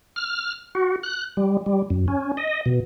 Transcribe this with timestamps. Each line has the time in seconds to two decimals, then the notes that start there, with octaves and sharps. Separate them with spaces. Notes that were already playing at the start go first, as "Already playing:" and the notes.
0.16 F6
0.75 F#4
1.03 F#6
1.37 G3
1.66 G3
1.90 F#2
2.08 C#4
2.37 D#5
2.66 B2